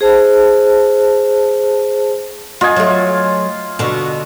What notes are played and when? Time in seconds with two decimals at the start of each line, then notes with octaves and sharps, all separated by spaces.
0.01 G#4 C5 A5
2.61 B3 F4 D#5 G#5
2.76 F#3 A3
3.79 B2 D3